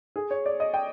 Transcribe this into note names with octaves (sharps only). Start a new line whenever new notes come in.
G#4
C#5
D5
D#5
G5